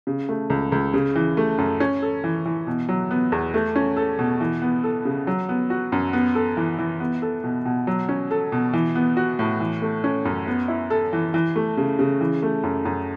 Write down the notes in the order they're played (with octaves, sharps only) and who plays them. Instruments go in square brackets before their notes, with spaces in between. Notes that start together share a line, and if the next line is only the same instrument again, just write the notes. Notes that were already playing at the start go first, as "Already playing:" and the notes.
[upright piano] C#3
A3
C#2
C#2
C#3
E3
A3
F#2
C#4
A4
E3
E3
B2
F#3
B3
E2
A3
C#4
A4
B2
E3
B3
A4
C#3
F#3
B3
F#4
F#2
B3
A4
E3
E3
B3
A4
B2
B2
F#3
C#4
A4
B2
E3
B3
F#4
A2
E3
A3
C#4
F#2
B3
E4
A4
E3
E3
A3
C#3
C#3
E3
A3
F#2
F#2